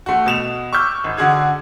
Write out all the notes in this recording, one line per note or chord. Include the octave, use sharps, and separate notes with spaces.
A3 F#4
B2 E7 F7
C#6 D6 E6 F6 G6
G#1
D3 F#4 G#4 G#6